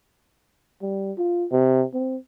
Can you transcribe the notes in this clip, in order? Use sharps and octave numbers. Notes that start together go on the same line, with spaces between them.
G3
F4
C3
C4